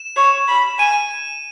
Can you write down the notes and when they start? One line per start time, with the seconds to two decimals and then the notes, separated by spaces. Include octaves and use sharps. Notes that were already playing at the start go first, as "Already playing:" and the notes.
Already playing: E7
0.16 C#5
0.48 B5
0.79 G#5 D#7